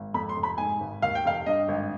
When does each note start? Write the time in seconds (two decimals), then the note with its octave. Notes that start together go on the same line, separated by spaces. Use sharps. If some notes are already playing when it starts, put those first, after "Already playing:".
Already playing: G#1
0.14 F2 B5
0.29 C6
0.36 F1
0.43 B5
0.58 G#2 G#5
0.80 G#1
1.02 D#2 F5
1.15 G5
1.25 F1 F5
1.46 G2 D#5
1.68 G#1